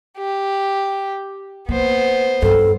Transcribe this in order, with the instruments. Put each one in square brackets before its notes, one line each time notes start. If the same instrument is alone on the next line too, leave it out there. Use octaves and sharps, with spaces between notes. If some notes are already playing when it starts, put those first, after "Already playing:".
[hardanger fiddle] G4
[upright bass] A#3 [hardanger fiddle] B3 C5
[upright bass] G2 [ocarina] A4